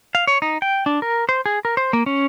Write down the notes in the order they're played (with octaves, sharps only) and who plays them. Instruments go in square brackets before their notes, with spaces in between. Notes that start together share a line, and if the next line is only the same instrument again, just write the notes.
[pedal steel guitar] F5
C#5
D#4
G5
D4
A#4
C5
G#4
A#4
C5
A#3
C#4